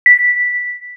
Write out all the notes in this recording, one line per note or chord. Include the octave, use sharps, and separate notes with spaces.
B6